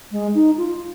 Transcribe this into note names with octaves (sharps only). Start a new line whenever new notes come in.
G#3
D#4
F4